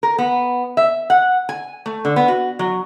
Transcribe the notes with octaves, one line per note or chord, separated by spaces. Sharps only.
A#4
B3
E5
F#5
G#5
A3
D3
B3
F#4
F#3